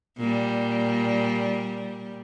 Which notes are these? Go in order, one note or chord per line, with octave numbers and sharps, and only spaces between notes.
A#2 G3